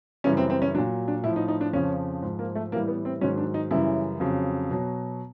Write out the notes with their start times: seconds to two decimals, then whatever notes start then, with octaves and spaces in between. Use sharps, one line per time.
0.24 F#2 C#3 E3 G3 C#4
0.37 C4
0.50 C4
0.62 C#4
0.74 F#3 D4
0.78 A#2
1.08 D4
1.24 A2 E4
1.28 F3
1.36 D#4
1.48 D#4
1.61 D4
1.73 F2 C#3 F3 C#4
2.22 G#2 F3
2.39 A#3
2.55 A3
2.72 A2 E3 G3 A#3
2.88 B3
3.05 C4
3.21 G#2 D#3 F#3 C#4
3.38 D4
3.54 D#4
3.71 F#2 C#3 E3 G3 E4
4.20 F2 C#3 F#3
4.70 B2 F#3